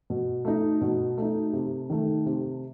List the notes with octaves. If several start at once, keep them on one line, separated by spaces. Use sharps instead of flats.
B2
A3 D#4
B2
A3 D#4
C3
D#3 A3
C3